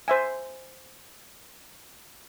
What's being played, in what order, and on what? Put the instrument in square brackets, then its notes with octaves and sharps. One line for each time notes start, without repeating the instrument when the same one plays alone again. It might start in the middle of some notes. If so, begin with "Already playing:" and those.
[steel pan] C5 E5 G#5